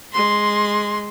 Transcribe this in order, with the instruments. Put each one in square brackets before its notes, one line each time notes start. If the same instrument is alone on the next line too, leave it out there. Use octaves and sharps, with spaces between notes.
[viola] G#3 C6